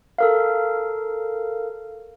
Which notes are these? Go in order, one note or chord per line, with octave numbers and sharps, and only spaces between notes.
A4 A#4 F5